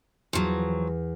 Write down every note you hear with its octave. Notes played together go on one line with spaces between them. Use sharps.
E2 F3 F#3